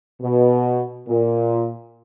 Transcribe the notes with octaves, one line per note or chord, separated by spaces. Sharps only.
B2
A#2